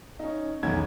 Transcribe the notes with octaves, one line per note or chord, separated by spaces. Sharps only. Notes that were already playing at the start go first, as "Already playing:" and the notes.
C#4 D#4
B1 E2 D#3 C#4 G#6